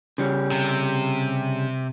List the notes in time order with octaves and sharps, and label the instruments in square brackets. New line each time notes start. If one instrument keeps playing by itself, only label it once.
[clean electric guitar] C#3 G3 C#4
[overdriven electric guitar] C3